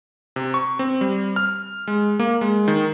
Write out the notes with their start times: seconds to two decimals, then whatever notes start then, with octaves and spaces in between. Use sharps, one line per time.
0.36 C3
0.54 C#6
0.79 C4
1.01 G3
1.36 F6
1.88 G#3
2.19 A#3
2.41 G#3
2.68 D#3